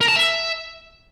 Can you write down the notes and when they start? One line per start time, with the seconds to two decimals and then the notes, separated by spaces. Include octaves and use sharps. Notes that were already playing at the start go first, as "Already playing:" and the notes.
0.01 A#4
0.08 A5
0.16 E5